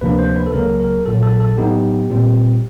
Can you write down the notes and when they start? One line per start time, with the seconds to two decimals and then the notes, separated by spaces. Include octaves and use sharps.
0.01 D2 C3 F3 A#3 D4 B4
0.19 C5
0.36 B4
0.46 A4
0.53 C#2 C#3 F#3 A#3 A#4
0.80 A#4
1.06 A#1 A#2 F#3 A4
1.23 A4
1.40 A4
1.57 A2 F#3 B3 D#4 G4
2.10 A#2 G3 C4